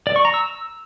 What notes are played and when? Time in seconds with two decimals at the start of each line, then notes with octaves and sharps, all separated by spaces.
0.07 D5
0.16 C#6
0.25 A#5
0.34 E6